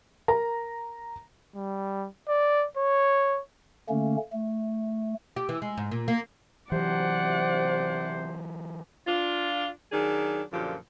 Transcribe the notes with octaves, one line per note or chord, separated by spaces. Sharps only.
A#4 A#5
G3
D5
C#5
D3 A3 A#3 C#4
A3
G4
E3
G#3
G#2
A#2
A#3
C3 E3 F#3 C5 D5 F#5
D4 F4
D#3 F#3 D4 G#4
F#2 A#2 D3 F3 G4